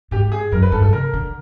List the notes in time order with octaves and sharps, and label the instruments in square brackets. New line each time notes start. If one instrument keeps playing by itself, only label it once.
[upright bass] G#2 [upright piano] G4
[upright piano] G#4
[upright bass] F#2 [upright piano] A#4
[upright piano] B4
[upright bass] G2 [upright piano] A4
[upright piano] A4
[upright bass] C#3 [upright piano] A#4
[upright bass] D3